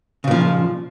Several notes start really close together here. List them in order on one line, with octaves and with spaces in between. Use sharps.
C#3 A#2 F3